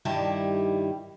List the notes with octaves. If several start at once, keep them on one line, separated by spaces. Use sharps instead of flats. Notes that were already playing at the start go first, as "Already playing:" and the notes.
G2 D#3 G3 E4 G4 A5